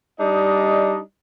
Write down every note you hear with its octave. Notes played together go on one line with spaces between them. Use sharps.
G3 D4 D#4 D#5